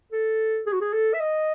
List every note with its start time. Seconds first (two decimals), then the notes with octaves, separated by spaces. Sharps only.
0.12 A4
0.66 G#4
0.73 F#4
0.81 G#4
0.93 A4
1.14 E5
1.20 D#5